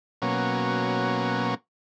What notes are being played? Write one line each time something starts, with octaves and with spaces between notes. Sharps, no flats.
B2 F#3 A#3 C#4